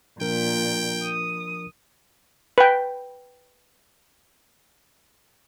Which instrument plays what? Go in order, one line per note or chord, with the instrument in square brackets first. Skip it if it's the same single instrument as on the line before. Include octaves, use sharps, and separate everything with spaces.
[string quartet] A#2 [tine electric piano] F3 D4 A#4 [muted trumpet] G5
[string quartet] D#6
[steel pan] B4 G5